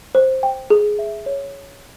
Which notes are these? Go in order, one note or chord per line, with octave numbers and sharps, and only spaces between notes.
C5
G5
G#4
E5
C#5